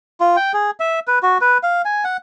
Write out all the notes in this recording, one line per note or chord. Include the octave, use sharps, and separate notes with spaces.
F4
G5
G#4
E5
B4
F#4
B4
F5
G#5
F#5